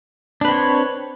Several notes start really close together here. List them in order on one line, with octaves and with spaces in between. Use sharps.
D4 B4 C4 C#5